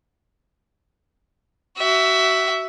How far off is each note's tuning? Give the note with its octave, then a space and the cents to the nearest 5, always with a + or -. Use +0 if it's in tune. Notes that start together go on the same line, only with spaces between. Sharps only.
F#4 +25 E5 +0